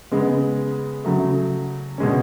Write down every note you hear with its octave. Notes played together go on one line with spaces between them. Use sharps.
C#3 G#3 B3
C#3 F#3 A3
B2 G#3 C#4